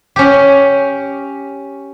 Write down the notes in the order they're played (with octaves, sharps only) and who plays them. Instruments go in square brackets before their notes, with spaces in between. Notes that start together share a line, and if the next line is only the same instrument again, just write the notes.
[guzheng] C#4 G4